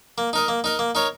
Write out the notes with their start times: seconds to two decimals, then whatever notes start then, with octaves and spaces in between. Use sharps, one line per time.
0.18 A#3
0.33 D#4 A#4 D#5
0.48 A#3
0.64 D#4 A#4 D#5
0.79 A#3
0.95 D#4 A#4 C#5